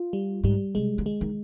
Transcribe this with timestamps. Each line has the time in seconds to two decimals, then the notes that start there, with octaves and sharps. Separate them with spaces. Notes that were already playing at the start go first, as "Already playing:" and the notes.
Already playing: F4
0.13 G3
0.43 G#2 G3
0.75 C3 G#3
0.98 D3
1.06 G#3
1.21 D#3